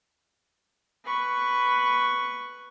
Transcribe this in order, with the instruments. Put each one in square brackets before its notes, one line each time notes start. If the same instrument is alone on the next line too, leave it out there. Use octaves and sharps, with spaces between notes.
[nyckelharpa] B4 C#6